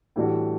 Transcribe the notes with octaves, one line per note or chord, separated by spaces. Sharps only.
A2 E3 G3 D4 F#4